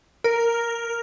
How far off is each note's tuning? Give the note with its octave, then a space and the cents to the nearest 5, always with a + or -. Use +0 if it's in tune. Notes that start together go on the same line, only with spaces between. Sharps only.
A#4 +0